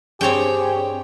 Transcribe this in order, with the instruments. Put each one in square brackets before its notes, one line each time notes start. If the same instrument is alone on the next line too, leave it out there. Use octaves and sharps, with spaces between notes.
[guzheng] G2 C4 [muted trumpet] G4 [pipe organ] G#4 [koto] C#5 G5